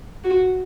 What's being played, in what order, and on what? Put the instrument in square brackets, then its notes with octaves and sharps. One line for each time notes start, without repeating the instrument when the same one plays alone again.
[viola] F#4